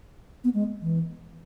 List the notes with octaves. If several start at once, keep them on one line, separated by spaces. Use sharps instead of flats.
B3
G#3
E3